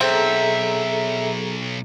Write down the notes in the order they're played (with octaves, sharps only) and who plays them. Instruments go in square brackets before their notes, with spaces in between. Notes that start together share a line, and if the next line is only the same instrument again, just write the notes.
[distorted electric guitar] B1 [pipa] C4 [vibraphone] G#4 A4 A#5 [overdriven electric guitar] E5